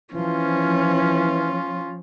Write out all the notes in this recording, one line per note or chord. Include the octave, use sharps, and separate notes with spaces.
E3 F3 C#4 F4